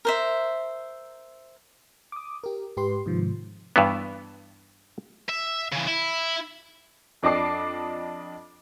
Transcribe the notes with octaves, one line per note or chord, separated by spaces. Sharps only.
A#4 C5 E5
D6 D#6
G4 A#4
G#2 G4 B4 C6
G#2 C3 D#3 F3
G2 E3 B3
E5
C#3 E3
E4
F2 D4 D#5 A5 D6 C7